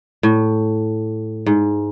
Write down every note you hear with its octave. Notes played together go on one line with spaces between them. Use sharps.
A2
G#2